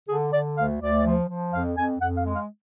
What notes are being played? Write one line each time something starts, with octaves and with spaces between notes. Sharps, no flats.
D3 G#4
D3 D5
D2 F5
D2 D5
F3
F3
F2 F5
F2 G#5
F2 F#5
F5
G#3
F5